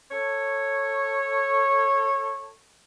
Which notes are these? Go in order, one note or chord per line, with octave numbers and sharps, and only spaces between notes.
A4 C#5